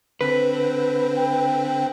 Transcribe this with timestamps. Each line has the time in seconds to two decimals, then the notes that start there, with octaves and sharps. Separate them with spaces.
0.21 D3 C4 B4
1.16 G5